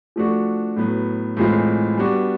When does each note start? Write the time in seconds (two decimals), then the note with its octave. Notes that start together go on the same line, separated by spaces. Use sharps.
0.16 F3 A3 D4 F#4
0.76 A2 F#3 B3
1.37 A2 E3 G#3 C4 F4
1.97 G3 B3 D4 F#4